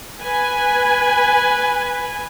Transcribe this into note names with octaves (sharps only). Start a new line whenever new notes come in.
B4 G#5